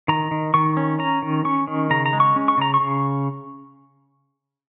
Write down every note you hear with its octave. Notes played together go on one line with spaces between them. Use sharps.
D#3 A#5
D#3
D#3 C#6
C#4
C#4 A#5
D#3
C#4 C#6
D#3
C#3 A#5
A#5
G#3
C#6
C#4
C#6
C#3 A#5
C#6
C#3